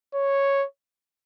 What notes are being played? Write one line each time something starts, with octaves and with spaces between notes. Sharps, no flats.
C#5